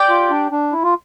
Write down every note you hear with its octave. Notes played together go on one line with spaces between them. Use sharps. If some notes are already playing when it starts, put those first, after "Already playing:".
Already playing: G4 D5 G5
F4
D4
D4
E4
F4